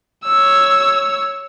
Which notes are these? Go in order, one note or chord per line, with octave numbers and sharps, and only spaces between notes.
C#5 E6